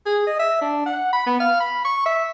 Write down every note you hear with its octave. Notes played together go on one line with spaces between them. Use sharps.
G#4
D#5
E5
D4
F#5
B5
B3
F5
B5
C#6
E5